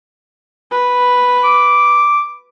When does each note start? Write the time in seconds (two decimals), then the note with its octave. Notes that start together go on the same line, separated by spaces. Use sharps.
0.72 B4
1.44 D6